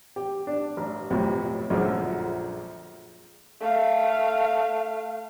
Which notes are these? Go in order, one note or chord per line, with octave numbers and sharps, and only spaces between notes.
G4
D4
A1
B1 F2 A2 C3
A#1 F#2 D3 F3 G#3
A3 F5